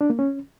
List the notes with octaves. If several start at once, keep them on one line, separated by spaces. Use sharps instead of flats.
D4
A#3
C#4